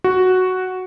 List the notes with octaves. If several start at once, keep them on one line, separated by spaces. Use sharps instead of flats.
F#4